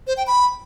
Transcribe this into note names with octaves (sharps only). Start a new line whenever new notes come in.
C5
G5
B5